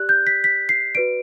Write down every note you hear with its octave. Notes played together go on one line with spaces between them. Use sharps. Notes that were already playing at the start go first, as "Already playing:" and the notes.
Already playing: G4 D5 F#6
G6
B6
B6
C7
F#4 B4 D5 D7